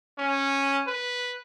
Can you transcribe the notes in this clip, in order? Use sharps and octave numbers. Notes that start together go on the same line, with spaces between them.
C#4
B4